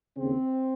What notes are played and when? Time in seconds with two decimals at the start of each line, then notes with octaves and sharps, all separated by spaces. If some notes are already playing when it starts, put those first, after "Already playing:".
0.17 D#2 C#3 C4